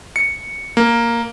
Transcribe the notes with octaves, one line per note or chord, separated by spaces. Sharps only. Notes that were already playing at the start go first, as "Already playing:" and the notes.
C#7
A#3